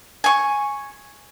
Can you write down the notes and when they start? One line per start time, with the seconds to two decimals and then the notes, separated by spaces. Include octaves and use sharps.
0.24 G#5 C#6